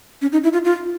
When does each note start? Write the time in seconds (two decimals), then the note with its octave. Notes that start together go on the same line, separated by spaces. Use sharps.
0.22 C#4
0.32 D#4
0.44 E4
0.53 F4
0.65 F4